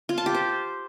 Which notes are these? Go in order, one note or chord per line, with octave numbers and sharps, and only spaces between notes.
F4
A5
G4
C5